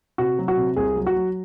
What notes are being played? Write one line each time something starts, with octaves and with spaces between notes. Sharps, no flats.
C3 F#4
F#3
F#4
C3
C2 G#4
F#3
F#4
F#3